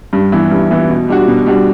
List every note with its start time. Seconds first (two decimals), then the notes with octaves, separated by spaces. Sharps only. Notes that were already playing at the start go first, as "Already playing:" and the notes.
0.13 G2
0.32 E3 B3 E4
0.51 G2
0.71 E3 B3 E4
0.89 B2
1.08 G3 D4 F#4
1.28 B2
1.46 G3 D4 F#4